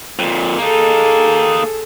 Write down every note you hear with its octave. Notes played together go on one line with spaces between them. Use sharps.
F2 A#2
A#3 D#4 G#4 A4